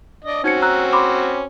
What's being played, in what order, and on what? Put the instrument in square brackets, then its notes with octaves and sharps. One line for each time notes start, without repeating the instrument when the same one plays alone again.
[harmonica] D4 D#5
[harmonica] C4 C#4 F#4 [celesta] D#4 G#6 C#7
[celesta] A#5 E6 F#6
B5 C6 D6